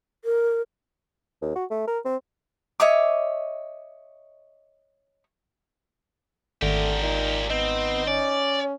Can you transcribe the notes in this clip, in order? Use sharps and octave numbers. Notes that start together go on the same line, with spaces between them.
A#4
D#2
F#4
A3
A#4
C4
C#5 D#5 E5 D6
G#1 D3 A3 G4 A#4
A#2 D#4
B3 C4 D#4
C#4 D5